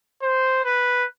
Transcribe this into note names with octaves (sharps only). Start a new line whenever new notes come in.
C5
B4